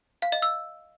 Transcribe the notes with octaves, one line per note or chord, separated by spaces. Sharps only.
F5
D#5
E6